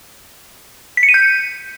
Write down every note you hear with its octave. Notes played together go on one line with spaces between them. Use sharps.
B6
C#7
D#7
G6